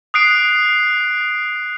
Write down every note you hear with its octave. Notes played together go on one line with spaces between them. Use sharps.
D#6 F#6 C7 D7